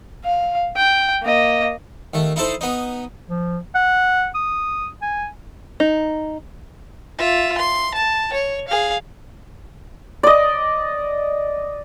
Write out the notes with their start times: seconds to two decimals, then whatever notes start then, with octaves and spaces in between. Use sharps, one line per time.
0.24 F5
0.76 G5
1.22 A#3 D#5
2.14 D#2 A3
2.36 D#4 E4 A4 C5
2.61 B3 D#4
3.30 F3
3.75 F#5
4.35 D#6
5.02 G#5
5.80 D#4
7.18 F4 E5
7.58 C6
7.94 A5
8.33 C#5
8.68 G#4 F5
10.23 D5 D#5